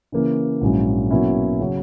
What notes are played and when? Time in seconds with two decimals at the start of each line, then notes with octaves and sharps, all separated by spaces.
0.12 C#3 E3 A#3
0.61 A#1 G#2 F#3 C#4 E4
1.11 B2 F#3 A#3 C#4 E4
1.60 C#3 F#3 C#4